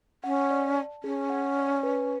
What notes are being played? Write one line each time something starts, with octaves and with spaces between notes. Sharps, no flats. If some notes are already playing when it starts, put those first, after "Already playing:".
C#4 F#5
D5
A5
C#4 G#4
F#5
D5
B4